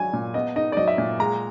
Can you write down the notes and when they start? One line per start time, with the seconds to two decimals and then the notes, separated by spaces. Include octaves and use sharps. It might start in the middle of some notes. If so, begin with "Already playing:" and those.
Already playing: F#3 D4 G#5
0.13 A#2
0.34 B3 D#5
0.56 D#4 D#5
0.72 D5
0.77 F#3 D#5
0.88 E5
0.98 A#2
1.19 G#3 A#5